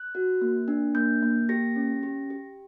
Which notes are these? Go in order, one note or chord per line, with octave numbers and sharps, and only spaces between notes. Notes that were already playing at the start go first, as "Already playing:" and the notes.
Already playing: F#6
F#4
A#3
D4
A#3 G6
A#3
G4 A#6
C#4
G4
G4